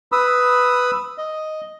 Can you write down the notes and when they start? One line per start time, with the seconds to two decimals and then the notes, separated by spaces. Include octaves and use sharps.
0.12 B4 B5 D#6 E6
1.18 D#5